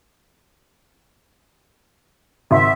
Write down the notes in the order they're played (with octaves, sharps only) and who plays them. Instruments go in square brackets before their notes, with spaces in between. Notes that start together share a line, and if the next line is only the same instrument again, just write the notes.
[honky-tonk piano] G#1 C6 [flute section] E5